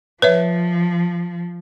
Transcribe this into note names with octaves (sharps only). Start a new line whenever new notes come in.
F3 B4 C#5 E5